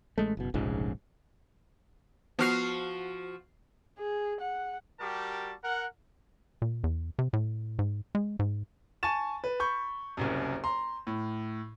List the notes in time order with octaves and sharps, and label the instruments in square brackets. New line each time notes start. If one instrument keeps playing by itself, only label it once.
[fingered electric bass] A1 G#3 A3
F#1 B2
F1 A#1 G#2 C#3
[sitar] F3 F#4 [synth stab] B3 F6 C7
[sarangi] G#4
F#5
[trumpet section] G3 F#4 G4 A#4 A5
A#4 F#5
[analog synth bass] A#2
E2
C3
A2
G#2
G#3
G#2
[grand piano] G#5 A5 C#6 A6 E7
B4
B5 C#6 G6
F#1 C2 F#2
A#5 C6
A2